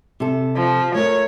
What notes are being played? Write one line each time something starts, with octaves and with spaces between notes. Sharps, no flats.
C3 A4
F3
A3 A#4 C#5